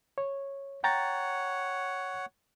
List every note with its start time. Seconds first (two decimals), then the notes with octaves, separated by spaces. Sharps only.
0.18 C#5
0.84 C#5 F#5 G5 A#5 A6